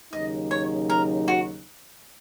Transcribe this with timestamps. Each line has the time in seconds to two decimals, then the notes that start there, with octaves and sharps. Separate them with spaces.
0.12 D#2 C#3 F#3 D#4 D#5
0.51 C#5
0.90 A#4
1.28 F#4